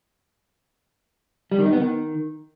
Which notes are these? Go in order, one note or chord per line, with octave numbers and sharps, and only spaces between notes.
G3
D#3
D#4
B3
D#3